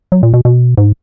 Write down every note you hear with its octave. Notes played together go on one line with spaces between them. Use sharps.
F#3
A#2
B2
B2
G#2